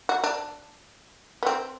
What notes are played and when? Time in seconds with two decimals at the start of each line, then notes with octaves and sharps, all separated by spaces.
0.09 F#4
0.24 D4
1.43 B3
1.46 C4